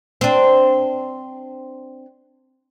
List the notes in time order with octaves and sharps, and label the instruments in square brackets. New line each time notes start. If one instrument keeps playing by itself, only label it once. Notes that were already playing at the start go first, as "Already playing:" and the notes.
[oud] C4 D4